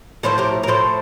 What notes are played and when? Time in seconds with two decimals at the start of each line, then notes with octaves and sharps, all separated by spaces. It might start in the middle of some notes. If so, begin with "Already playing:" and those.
0.23 A2 F3 A3 A4 C5
0.38 G4 A#4
0.63 A#4
0.67 A2 F3 A3 A4 C5